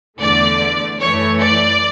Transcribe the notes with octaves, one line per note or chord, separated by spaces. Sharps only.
E2 D3 A3 D5
F#2 E3 A3 C#5
D5